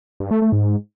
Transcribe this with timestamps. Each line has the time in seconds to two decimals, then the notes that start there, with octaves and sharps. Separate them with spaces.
0.20 G2
0.31 A3
0.42 A3
0.52 G#2